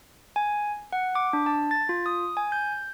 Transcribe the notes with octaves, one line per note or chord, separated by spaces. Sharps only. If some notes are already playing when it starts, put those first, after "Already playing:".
G#5
F#5
D6
D4
A5
A6
F4
D#6
G#5
G6